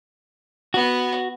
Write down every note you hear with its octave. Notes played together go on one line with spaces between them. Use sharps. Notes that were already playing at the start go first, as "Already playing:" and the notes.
B3 F#4